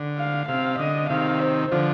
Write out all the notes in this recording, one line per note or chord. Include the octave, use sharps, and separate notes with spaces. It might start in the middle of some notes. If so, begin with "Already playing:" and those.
Already playing: D3
F5
C3 F5
D3 D#5
C3 D#3 F5
C5
D3 F3